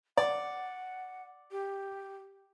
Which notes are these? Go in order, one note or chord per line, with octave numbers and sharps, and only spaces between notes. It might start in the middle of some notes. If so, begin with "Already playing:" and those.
D5 F#5
G4